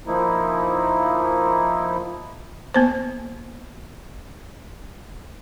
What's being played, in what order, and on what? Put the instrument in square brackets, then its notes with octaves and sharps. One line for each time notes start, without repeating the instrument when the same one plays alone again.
[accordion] F3 A#3 D#4 E4
[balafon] A#3 B3 C5